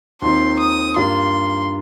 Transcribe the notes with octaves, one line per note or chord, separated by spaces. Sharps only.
D#2 D#3 C4 F4 C6
D#6
G2 G3 A#3 F4 C6